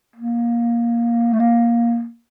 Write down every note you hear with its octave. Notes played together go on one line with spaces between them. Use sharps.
A#3
A3
A#3